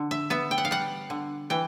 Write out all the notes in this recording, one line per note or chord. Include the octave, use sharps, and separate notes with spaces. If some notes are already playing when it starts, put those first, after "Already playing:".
Already playing: D3
E5
B3 E5
G5
F#5
F5
G3 F#5
D3
E3 G5